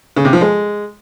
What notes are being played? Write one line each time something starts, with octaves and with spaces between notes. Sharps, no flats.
C#3
C3
F3
G#3